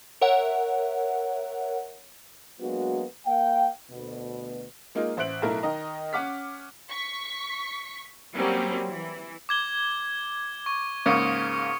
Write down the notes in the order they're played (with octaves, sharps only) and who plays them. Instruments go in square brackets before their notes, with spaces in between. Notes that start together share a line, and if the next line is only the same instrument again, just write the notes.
[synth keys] A#4 C#5 E5 F#5
[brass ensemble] F#3 G#3 A#3 B3 D4 F#4
A#3 F5 G5
D2 B2
[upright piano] G#3 A#3 D#4 F4
A1 C5 E5 F#6 D7 F#7
B1 A3 E4 A#4
D#3 D#5 A#5
C#4 F#5 D6 F6 B6
[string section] C#6 B6
F#3 G3 A#3 C4 C#4
E3
[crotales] D6 G#6 G7
C#6
[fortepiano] G#2 C#3 A#3 [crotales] C#6 D#6 C#7